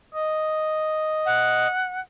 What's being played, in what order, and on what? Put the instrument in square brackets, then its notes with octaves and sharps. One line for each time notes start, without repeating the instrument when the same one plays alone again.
[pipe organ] D#5
[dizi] F#5